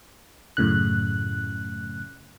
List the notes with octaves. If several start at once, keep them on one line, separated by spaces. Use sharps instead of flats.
F#2 A2 C#3 F#6